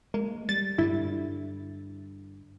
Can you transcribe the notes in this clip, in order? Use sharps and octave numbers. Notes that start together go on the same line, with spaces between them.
G#3 A#3
G3 A6
G2 D3 G3 E4